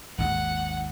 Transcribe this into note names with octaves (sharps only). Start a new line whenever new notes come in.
G#1 D#2 F#5